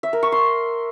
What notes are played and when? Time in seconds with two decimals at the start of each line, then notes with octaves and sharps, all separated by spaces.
0.03 E5
0.13 A#4
0.23 C#6
0.32 C6